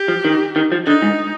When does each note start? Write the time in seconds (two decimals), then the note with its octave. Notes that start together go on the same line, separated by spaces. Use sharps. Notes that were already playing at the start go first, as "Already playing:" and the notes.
Already playing: G4
0.08 F3
0.25 D#3
0.56 D#3
0.72 F3
0.86 D3 D#4
1.02 G#2